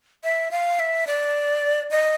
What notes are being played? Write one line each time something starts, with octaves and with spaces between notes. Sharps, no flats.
E5
F5
E5
D5
D#5